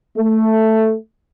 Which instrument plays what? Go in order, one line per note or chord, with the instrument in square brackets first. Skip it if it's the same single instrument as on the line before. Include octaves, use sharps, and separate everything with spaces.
[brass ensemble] A3